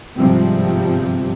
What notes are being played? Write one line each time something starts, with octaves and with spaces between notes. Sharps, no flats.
G1 G#2 C3 F3 G3 C4